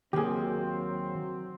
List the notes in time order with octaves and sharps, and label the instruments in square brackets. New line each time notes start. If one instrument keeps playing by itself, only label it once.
[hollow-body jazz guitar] D#2 A#3 [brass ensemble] F#3 C4 [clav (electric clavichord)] G4 G#4